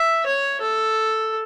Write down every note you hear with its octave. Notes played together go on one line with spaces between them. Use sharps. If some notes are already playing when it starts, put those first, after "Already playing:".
Already playing: E5
C#5
A4